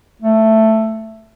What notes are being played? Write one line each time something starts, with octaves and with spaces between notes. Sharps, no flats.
A3